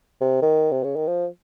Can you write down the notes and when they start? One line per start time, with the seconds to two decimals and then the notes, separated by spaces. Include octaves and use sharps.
0.21 C3
0.42 D#3
0.72 C3
0.84 C#3
0.96 D#3
1.08 F3